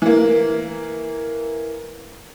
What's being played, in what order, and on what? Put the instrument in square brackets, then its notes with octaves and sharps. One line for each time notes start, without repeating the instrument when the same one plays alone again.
[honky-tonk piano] E3 A#3